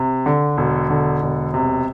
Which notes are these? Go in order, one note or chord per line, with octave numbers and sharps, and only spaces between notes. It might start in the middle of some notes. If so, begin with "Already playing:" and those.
Already playing: C3
D3
E1
D3
E1
C3